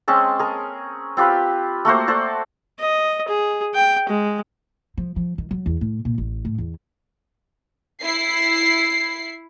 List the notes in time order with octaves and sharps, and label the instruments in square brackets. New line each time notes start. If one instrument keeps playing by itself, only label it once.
[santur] G#3 C4 C#4 A5
G#4 A#4
C4 F4 G4 B4
A3 A#3 F#4 C5
A4 C5 D5 A5
[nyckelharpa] D#5
G#4
G5
G#3
[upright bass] F3
F3
D#3
F#3
E2
A2
A#2
A1
A2
E2
[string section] E4 C7